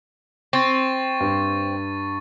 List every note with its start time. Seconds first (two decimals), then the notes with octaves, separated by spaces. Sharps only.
0.53 C4 C#6 A6
1.20 G2